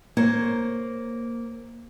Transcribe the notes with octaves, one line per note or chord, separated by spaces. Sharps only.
A#3 C5 C#5